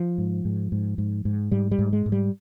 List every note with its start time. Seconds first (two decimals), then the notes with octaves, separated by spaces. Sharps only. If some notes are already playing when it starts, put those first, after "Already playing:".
Already playing: F3
0.18 G#2
0.45 G#2
0.72 G#2
0.98 G#2
1.25 G#2
1.51 G#2 G3
1.71 G3
1.79 G#2
1.93 G#3
2.06 G#2
2.12 G3